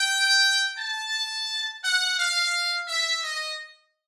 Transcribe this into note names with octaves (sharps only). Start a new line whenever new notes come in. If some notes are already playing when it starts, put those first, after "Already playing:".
Already playing: G5
A5
F#5
F5
E5
D#5